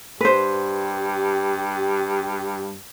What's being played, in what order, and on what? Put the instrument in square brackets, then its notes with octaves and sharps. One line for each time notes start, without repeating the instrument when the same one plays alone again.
[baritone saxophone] G2 [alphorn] G4 [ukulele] B4 C5